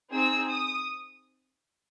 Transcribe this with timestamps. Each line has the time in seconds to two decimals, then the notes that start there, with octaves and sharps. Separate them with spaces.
0.11 C4 D#4 G#4 E6
0.49 D#6